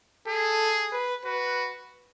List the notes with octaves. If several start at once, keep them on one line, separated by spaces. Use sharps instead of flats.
G#4 A4
B4
F#4 B4